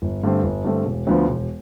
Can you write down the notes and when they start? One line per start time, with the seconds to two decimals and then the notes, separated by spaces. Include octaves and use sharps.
0.02 G1
0.23 G2 D3 A3 C4
0.43 G1
0.64 G2 D3 A3 C4
0.85 E1
1.07 D2 D3 F3 B3
1.28 E1